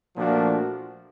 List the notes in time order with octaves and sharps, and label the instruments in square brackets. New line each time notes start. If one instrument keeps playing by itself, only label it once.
[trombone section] A#2 F3 A3 D4 F#4